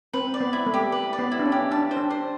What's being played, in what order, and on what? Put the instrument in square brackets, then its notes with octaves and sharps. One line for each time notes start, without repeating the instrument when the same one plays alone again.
[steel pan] C4 [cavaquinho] B4
[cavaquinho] D5
[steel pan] B3
[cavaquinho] E4
[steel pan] A3
[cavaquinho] G4
B4
D5
[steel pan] B3
[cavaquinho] E4
[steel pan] D4
C#4
[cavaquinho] G4
[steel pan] D4 [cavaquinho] A5
[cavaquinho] C5
[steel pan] D4
[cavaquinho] C5